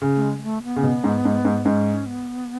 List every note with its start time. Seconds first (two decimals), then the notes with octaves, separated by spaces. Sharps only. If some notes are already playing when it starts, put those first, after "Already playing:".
0.02 C#3
0.16 A3
0.22 G#3
0.38 G#3
0.43 A3
0.64 B3
0.76 C#3
0.83 B2
1.04 G#2
1.25 G#2
1.45 G#2
1.65 G#2 C#4
2.06 B3